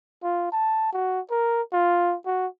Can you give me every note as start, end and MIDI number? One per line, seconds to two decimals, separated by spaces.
0.23 0.51 65
0.52 0.93 81
0.93 1.21 66
1.31 1.62 70
1.73 2.16 65
2.26 2.47 66